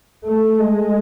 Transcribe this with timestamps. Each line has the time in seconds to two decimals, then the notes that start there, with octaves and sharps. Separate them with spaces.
0.25 A3
0.59 G#3